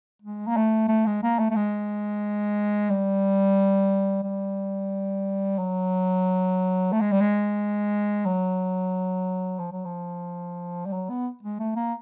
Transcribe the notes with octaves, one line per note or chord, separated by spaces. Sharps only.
G#3
A#3
A3
A3
G#3
A#3
A3
A3
G#3
G3
G3
F#3
A3
G#3
G3
G#3
F#3
F3
F#3
F3
G3
F#3
B3
G#3
A3
A#3